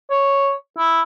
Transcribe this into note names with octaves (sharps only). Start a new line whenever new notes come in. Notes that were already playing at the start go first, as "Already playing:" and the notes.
C#5
E4